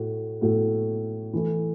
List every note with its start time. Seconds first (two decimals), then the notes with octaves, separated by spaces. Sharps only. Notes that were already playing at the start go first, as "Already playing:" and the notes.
Already playing: A2 A3 F#4
0.41 A2 A3 F#4
1.33 E3 A3 E4